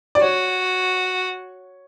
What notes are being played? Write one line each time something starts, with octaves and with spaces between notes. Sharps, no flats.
D5
F#4 C#5